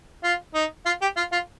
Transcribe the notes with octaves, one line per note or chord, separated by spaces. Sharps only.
F4
D#4
F4
G4
F4
F4